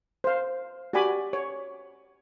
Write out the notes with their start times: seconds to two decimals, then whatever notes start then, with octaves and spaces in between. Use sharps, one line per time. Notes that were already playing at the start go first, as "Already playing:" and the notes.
0.24 C5 F5
0.93 F#4 G4 D5 G#5 B5 D6
1.33 C#5